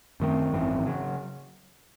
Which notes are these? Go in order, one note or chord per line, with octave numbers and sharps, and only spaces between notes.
F#2 D#3 A3 C4
G#1 F#2 E3 C4
C#3 F#3